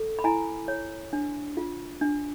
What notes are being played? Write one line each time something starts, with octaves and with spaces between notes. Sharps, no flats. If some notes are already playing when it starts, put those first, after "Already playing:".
Already playing: A4
B5
E4 G#5 A#5
C#5
D4
F4
D4